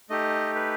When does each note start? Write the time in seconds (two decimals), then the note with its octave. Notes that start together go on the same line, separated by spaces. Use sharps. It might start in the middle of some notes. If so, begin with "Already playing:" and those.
0.10 A3 D#4 G4 D#5
0.55 B4